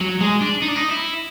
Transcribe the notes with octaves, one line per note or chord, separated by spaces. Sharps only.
F#3
G#3
D4
D#4
D4
D#4
E4